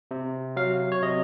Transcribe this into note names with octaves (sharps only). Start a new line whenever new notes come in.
C3
F#3 F5
C#5
C3 D#5